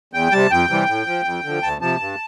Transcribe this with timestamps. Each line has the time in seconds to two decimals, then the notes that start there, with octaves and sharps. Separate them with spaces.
0.13 E2 G5
0.32 C3 G3 A5
0.50 F2 G5
0.69 C3 E3 G3
0.88 A2
1.07 F3
1.25 F2
1.44 D3 F3
1.63 D2 A5
1.81 C3 F3 A5
2.00 G2